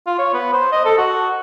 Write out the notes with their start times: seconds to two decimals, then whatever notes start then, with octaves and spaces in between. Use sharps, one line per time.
0.07 F4
0.18 C#5
0.34 B3
0.53 C5
0.72 D#5
0.85 A4
0.98 F#4